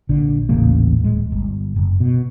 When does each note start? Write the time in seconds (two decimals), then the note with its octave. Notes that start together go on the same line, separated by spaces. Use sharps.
0.09 A#1 D3
0.49 D#1 A1 C#3 A#3
1.00 D1 G#3
1.32 G1
1.76 F#1
2.00 B2